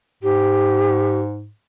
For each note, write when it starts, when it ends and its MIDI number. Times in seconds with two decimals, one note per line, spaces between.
0.23 1.50 44
0.23 1.18 67